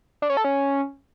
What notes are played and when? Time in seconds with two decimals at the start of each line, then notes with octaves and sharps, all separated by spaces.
0.22 D4
0.30 C#4
0.37 A4
0.44 C#4